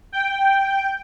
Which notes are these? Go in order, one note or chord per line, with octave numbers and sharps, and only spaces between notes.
G5